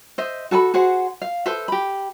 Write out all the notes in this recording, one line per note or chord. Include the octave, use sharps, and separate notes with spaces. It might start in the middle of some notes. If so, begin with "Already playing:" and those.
C5 D#5 E5
F#4 A4 G#5 B5
F#4 G#4 C5 F#5
F5
A4 B4 C5 E5
G4 B5